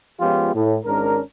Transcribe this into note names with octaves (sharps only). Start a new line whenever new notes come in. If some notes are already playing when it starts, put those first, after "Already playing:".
F3 G#3 B3 C#4 F4 G4
A2
G#1 G#2 C#4 D4 A#4